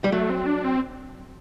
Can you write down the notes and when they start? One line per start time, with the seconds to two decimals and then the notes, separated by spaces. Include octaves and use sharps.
0.04 G3
0.12 F#3 A3
0.30 C4
0.46 D4
0.64 C4